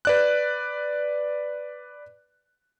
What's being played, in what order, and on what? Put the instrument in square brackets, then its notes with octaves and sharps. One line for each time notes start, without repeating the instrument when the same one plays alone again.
[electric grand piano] B4 D5 F#6